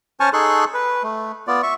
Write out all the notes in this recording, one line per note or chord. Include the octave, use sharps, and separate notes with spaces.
C#4 C5 G#5 A5 C#6 F6
D#4 G#4 A4 C6 C#6 F#6
B4
A3
B3 F4 D5
E5 C#6